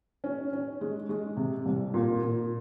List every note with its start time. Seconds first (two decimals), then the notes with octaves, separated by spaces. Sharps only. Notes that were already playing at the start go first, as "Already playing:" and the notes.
0.24 C#4
0.53 C#4
0.81 G#3
1.09 G#3
1.37 C3
1.65 C2
1.94 A#2
2.22 A#2